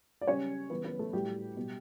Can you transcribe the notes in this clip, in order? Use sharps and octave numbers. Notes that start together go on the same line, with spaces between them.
D5
C#3 G3 C#4 C#5
C#3 E3 G3 B3 B4
B3 B4
A3 A4
A2 F#3 G3 G4
B2 G3